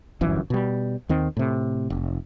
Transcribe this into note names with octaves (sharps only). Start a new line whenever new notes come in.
D1 G1 F#2 E3
B2 G3
D#2 D#3 C4
A2 C3
F1